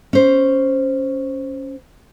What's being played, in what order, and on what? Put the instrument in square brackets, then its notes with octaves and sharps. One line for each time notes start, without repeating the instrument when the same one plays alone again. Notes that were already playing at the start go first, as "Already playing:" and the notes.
[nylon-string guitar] C#4 C5